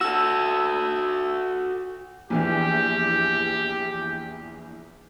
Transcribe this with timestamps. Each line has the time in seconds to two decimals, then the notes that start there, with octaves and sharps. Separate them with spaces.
0.01 F#4 A4 E6
2.30 A#1 E2 E3 G4